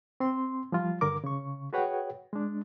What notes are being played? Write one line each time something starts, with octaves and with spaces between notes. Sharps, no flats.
C4 C6
F3 G3 F4
G2 D3 A#4 D6
C#3 C#6
F#4 G#4 B4 C#5 F#5 G5
G#3 D4